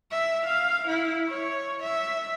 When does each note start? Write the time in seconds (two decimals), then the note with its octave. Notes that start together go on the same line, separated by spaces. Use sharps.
0.11 E5
0.46 F5
0.88 E4
1.29 C#5
1.83 E5